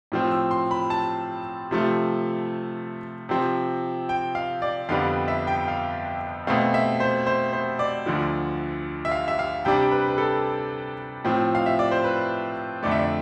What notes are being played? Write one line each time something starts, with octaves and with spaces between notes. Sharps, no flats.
A2 F3 C4
E6
C6
B5
A5
C3 F3 A3
C3 F3 C4
G5
F5
D5
F2 D3 G3 B3 D4 F5
E5
G5
F5
B2 A3 C4 F5
E5
C5
C5
C5
D5
D2 D3 F3
E5
F5
E5
F5
C3 G3 D4 G5
B4
B4
A4
A2 F3 C4
F5
E5
D5
C5
B4
F2 D3 A3 D5
E5
D5